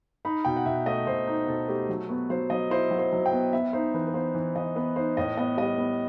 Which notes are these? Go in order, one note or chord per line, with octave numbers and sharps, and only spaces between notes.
D#4 B5
B2 G5
F#5
B2 E5
A3 D#5
B2 C5
D#4
B2 A4
A3 G4
F#3
B3 F#4
F#3 C5
F#3 D#5
E4 C5
F#3
C5
F#3
G5
B3
B3 E5
D#4 C5
E3 B4
B4
B3 C5
E3
E3 D#5
B3 B4
D#4 C5
A2 D#5
B3 D#5
G3 D#5
B3